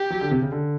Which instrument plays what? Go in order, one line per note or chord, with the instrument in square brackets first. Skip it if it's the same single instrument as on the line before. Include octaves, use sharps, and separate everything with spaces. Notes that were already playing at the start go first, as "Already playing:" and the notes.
Already playing: [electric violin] G4
[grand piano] F#3
D3
C3
C#3
D3